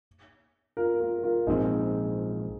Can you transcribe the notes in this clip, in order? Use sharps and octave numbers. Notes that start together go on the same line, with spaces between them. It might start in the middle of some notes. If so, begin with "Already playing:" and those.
F4 A#4
F4 A#4
F4 A#4
A#1 G#2 F3 C4 D#4 G#4